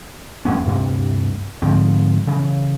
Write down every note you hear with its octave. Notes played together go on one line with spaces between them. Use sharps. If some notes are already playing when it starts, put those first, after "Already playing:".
E2 G#2 B3 C#4
D2 G2 C3
G#2 D3 F3 C4
C#3 E3